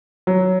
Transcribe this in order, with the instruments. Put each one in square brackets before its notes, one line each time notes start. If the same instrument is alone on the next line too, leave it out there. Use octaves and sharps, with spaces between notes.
[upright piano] F#3